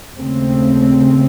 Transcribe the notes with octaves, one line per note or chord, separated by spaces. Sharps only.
D#2 C#3 A3 C4